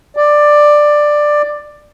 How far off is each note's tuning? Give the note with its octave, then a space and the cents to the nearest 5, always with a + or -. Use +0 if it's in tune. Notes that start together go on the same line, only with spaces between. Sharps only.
D5 +10